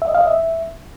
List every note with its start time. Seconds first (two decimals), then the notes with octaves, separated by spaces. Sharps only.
0.02 E5
0.08 D#5
0.15 F5
0.21 D#5
0.27 E5